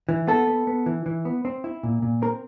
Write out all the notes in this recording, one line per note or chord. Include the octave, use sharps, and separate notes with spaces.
E3
B3 A4
B3
B3
E3
E3
B3
C4
E4
A#2
A#2
C4 A#4